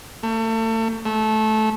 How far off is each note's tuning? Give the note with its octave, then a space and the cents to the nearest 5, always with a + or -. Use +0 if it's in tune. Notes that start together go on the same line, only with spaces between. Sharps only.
A3 +35
A3 -15